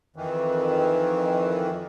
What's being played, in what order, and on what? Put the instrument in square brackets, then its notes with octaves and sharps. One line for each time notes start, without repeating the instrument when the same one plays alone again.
[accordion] F2 D#3 E3